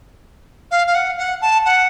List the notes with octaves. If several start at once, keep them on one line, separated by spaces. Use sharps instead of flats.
F5
F5
F#5
F#5
A5
F#5